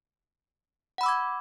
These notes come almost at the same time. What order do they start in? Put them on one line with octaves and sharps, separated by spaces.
F#5 B5 E6 D6 G#6